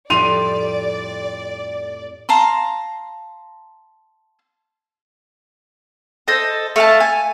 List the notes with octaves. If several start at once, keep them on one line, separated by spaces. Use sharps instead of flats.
F2 A2 G3 D5 C6 D#7 F7
F5 A5 A#5 C6
A4 C5 D#5
A3 F5 A5
G#5